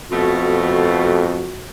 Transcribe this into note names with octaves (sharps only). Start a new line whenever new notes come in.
F2 B2 A3 F#4